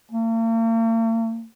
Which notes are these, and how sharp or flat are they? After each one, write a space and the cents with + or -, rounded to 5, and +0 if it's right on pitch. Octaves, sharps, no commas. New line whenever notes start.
A#3 -45